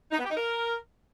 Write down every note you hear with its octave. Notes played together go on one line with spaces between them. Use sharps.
D#4
B3
G4
D#4
A#4